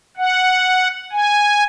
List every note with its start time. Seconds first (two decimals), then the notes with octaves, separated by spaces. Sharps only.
0.17 F#5
1.12 G#5